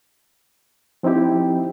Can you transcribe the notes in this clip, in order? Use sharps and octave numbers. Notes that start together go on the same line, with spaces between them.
F3 C4 D#4 E4 G4